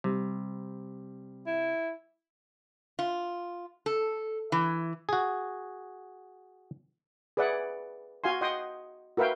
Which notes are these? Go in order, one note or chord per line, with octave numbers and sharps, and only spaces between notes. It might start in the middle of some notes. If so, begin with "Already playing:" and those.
C3 G3
E4
F4
A4
E3
F#4 G#4
G#4 B4 D5 E5 F#5
F#4 F5 G#5 C6
D#5 F#5 G5 C6 D#6
F#4 A#4 B4 E5 F5 G5